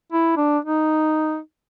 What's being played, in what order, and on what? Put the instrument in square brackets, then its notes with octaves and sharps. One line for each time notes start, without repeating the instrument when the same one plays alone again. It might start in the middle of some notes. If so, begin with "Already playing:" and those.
[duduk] E4
D4
D#4